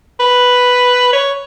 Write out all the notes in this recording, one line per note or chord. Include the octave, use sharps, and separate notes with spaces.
B4
C#5